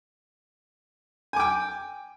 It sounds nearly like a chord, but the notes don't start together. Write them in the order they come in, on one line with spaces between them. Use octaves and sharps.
G#5 D6 G5